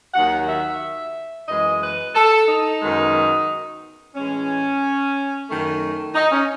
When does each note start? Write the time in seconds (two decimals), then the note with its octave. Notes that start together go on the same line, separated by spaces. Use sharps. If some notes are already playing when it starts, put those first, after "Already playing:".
0.14 D#2 D#3 F#3 F#5
0.48 E5
1.48 F#2 E3 G#3 D#5
1.82 B4
2.15 A4
2.48 D#4
2.82 F#2 D#3 G#3 B3
4.15 A2 E3 G#3 C#4
5.48 F#2 D#3 A3
6.15 D#4
6.32 C#4